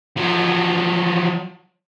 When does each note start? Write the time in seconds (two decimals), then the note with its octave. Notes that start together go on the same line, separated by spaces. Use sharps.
0.17 F3 F#3